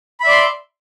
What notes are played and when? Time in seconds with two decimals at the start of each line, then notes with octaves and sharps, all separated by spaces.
0.20 B5
0.24 E5
0.27 D5
0.31 C6